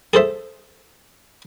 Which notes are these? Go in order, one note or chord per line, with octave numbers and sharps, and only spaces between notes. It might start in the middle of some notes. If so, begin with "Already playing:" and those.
G#4 A4 C5 E5